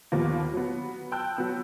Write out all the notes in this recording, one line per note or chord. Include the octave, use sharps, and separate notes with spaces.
D#2 A#2 F3 A#3 B3
F#3 B3
G5 A5 E6 F#6 G6
F#3 B3 E6